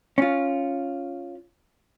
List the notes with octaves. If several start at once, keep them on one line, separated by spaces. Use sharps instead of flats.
C#4 F4